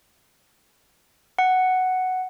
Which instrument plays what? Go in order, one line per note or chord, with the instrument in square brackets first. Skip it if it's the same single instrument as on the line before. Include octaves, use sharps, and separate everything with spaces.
[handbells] F#5